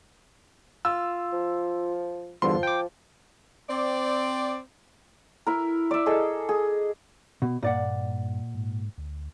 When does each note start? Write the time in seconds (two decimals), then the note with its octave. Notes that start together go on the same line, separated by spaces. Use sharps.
0.85 F4 E6
1.33 F3
2.42 E2 G2 D3 F3 C6
2.63 G5 D6
3.70 C4 D5
5.47 E4 A#4
5.91 D5 E5
6.06 G#4 A4 D#5
6.49 G#4
7.42 B2
7.63 G2 A#2 D5 F#5
8.54 G#2
8.98 D2